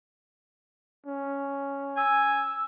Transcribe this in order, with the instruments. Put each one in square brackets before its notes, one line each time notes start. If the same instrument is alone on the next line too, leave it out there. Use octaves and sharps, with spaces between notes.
[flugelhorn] C#4
[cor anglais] G#5 [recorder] E6